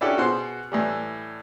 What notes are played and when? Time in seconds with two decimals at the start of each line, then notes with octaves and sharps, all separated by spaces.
0.01 C#4 D4 E4 F#4 G4 A4
0.18 B2 G#4 C5 F#5 C6
0.72 A2 E3 G3